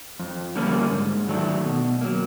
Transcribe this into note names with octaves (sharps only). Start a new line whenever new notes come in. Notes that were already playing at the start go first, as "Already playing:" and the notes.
F2
D3 G3 A#3 C#4
G#2
D#3 F#3 A3 D4
B2
F#3 A#3